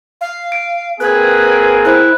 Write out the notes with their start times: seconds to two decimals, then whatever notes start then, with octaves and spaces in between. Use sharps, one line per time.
0.21 F5
0.52 D7
1.00 A#3 C4 G#4 B4 F#6 G#6
1.85 E4 C5 F#6